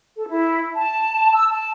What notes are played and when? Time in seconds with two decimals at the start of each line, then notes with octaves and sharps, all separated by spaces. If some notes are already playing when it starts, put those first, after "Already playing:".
0.16 A4
0.29 E4
0.76 A5
1.34 E6
1.49 A5